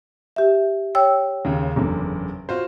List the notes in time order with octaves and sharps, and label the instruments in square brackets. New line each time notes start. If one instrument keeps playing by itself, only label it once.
[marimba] G4 E5
C#5 G5 E6
[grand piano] D#2 C#3
F#1 E2 D3
F4 F#4 C5